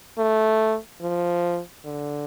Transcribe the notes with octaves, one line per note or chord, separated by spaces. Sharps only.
A3
F3
D3